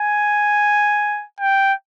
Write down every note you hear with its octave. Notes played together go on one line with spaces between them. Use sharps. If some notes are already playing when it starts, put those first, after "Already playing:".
Already playing: G#5
G5